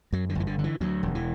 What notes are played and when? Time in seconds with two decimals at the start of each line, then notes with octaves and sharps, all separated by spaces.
0.13 F#2 F#3
0.29 D3
0.35 G1 E3
0.47 D3
0.59 D3
0.64 E3
0.81 D2 F#3
1.03 E1
1.15 E3